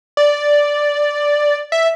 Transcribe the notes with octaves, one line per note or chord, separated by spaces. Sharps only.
D5
E5